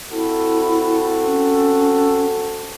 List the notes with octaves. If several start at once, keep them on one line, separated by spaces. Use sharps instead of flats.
C4 E4 F#4 A4
C#4